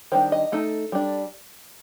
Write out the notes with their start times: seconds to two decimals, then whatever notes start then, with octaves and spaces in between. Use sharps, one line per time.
0.12 D#3 G3 D4 C5
0.32 D#5
0.52 A3 D#4 A4
0.92 G3 D4